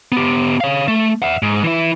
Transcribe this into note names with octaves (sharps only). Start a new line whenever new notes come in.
B3 G4
C#5 F5
A3
E5 F#5
G#2
E3 E4